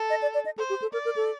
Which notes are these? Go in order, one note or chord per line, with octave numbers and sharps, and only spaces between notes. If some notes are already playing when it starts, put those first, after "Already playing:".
Already playing: A4
D#5
D5
D5
D#5
A4 C5
G4
A4
A#4 D5
A#4
A4